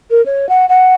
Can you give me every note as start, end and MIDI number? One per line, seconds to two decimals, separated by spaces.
0.11 0.24 70
0.26 0.49 73
0.49 0.68 78
0.69 0.95 78